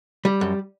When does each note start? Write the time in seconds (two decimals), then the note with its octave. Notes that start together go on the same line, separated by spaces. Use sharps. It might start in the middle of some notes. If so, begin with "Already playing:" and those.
0.25 G3
0.41 F#2